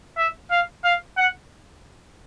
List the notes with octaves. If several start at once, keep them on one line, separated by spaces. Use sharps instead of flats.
E5
F5
F5
F#5